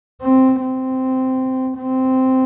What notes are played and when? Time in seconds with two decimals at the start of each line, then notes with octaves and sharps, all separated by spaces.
0.21 C4
0.61 C4
1.78 C4